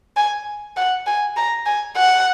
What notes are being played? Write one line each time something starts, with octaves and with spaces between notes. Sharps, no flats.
G#5
F#5
G#5
A#5
G#5
F#5